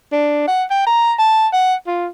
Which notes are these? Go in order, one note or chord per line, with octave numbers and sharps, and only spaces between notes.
D4
F#5
G5
A#5
A5
F#5
F4